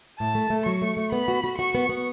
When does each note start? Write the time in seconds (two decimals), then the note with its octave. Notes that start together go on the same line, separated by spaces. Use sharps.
0.19 A2 A5
0.35 A3
0.50 A3
0.66 F#3 C#6
0.82 A3
0.97 A3
1.12 B3 B5
1.28 F#4
1.44 F#4
1.58 F#4 C#6
1.75 B3
1.89 B3